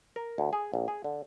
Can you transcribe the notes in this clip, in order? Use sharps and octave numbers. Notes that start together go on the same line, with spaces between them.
A#4
D2
G#4
A#1
G#4
D3